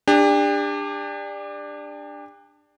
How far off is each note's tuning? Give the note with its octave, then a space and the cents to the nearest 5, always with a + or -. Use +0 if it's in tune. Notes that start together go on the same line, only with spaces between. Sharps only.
D4 +10 G4 +40